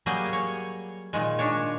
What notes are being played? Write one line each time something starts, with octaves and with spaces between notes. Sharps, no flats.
F#3 G3 A#3 G#4
C#5
A#2 D#3 G#3
D#3 D4 C#5